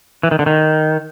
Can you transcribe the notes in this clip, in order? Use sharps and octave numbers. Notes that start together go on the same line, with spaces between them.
E3
D#3
D3
D#3